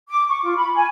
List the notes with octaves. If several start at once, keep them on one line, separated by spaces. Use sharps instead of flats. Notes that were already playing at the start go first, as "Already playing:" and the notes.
D6
C#6
F4
B5
G#5